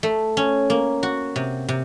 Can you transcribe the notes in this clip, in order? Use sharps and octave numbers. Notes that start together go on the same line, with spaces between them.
A3
C#4
A#3
F#4
C3
C3